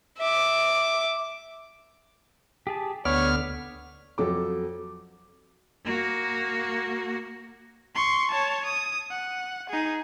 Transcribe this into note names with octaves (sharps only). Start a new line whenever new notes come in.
E5 D6
G4 G#4 A5
D2 D3 B3 C#5 D5 F6
F2 F#3 A4 D6
A#3 F#4
C6 C#6
C#5 A5
D#6
F#5
D#4 G#4